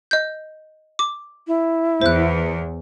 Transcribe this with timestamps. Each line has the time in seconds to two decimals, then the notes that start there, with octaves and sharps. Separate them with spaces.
0.11 D#5 G6
0.99 D6
1.47 E4
2.01 E2 C5 F#6